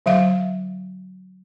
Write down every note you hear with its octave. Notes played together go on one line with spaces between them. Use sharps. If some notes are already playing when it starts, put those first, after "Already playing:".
D3 F#3 E5 F5